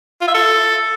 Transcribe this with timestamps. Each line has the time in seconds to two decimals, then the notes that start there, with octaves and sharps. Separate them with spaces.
0.21 F4
0.28 E5
0.34 A4